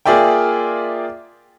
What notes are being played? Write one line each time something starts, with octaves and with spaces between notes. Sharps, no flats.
A#3 F4 G#4 D5 E5 G5